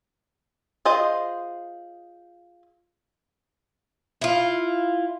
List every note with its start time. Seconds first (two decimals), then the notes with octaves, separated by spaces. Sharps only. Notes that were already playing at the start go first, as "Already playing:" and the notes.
0.85 F4 G#4 C5 D#5
4.21 E4 F4